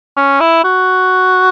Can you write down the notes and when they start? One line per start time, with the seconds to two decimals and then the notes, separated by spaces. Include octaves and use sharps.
0.17 C#4
0.40 E4
0.64 F#4